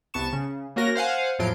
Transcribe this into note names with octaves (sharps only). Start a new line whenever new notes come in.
C2 B3 A5 C#6 E7
C#3
A#3 C#4 F#4 A#4 A#6
C5 F5 F#5 G#5
E2 A2 F3 F#3 C6 D7